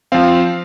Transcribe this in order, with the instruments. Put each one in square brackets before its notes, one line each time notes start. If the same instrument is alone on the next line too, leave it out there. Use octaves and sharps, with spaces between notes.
[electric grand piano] F3 C4 F5